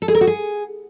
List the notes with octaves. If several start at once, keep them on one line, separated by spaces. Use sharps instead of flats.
A4
G#4
A#4
F#4
G#4